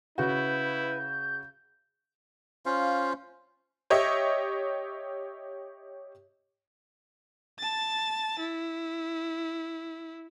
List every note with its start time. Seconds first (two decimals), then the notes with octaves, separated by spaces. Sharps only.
0.18 C#3 E4 F#4 B4 G6
2.66 C#4 F4 C5 F5
3.90 G4 C#5 D#5 E5
7.59 A5 A6
8.40 E4